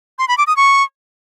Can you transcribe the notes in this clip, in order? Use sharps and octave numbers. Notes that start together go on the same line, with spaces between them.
C6
B5
D6
D#6
C#6